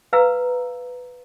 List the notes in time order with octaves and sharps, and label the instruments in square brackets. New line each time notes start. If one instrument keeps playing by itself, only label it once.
[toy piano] B4 F5 A#5 E6